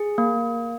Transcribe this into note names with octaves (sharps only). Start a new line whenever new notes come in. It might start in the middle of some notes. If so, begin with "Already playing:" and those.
Already playing: G#4
A#3